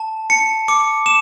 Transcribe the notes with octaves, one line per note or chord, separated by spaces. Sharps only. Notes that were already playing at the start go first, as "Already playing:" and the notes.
Already playing: A5
A5 C#7
D6 C#7
D6 E7